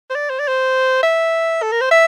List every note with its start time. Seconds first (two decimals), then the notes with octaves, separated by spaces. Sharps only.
0.10 C5
0.15 D5
0.30 C5
0.39 D5
0.48 C5
1.03 E5
1.62 A4
1.72 A#4
1.81 C5
1.91 E5